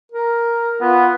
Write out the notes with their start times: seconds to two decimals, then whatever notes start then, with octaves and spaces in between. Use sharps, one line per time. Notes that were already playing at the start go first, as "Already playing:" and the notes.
0.12 A#4
0.81 B3 F4